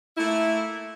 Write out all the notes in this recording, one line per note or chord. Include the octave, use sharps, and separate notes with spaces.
A3 A#3 E4